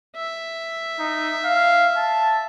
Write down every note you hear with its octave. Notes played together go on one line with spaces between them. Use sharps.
E5
D#4
F5
A5